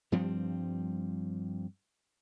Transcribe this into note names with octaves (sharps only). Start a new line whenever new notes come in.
G2 F3 G3 C4